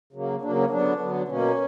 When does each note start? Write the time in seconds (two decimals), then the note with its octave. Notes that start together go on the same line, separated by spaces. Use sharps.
0.13 C#3 F#3 A#3
0.42 C#3 F#3 A#3 D4
0.56 C#4
0.70 D3 F#3 B3 D4
0.99 D3 F#3 B3
1.28 B2 A#3 C#4